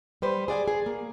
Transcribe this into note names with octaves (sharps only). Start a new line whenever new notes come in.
G3 B4 C5
G#4 D5 F#5 G#5
G#4
A#3